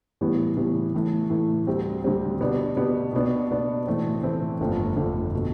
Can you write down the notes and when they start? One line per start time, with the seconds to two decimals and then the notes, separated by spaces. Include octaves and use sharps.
0.21 A2 E3 G3 B3
0.57 A2 E3 G3 B3
0.94 A2 E3 A3
1.30 A2 E3 A3
1.67 D2 D3 G3 C4
2.04 D2 D3 G3 C4
2.41 B2 B3 D4 G4
2.76 B2 B3 D4 G4
3.13 B2 B3 D4
3.50 B2 B3 D4
3.87 A2 E3 A3 C4
4.23 A2 E3 A3 C4
4.60 G1 F2 D3 A3
4.96 G1 F2 D3 A3
5.34 B2 A3